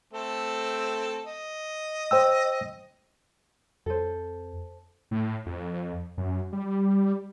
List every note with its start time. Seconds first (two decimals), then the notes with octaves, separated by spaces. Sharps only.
0.13 A3 C4 A4
1.26 D#5
2.11 C5 G5 E6
3.86 F2 A4 C5
5.11 A2
5.46 F2
6.18 F#2
6.52 G3